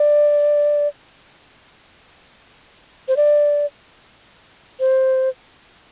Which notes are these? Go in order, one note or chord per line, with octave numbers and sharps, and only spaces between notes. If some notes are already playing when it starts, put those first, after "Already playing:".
Already playing: D5
C5
D5
C5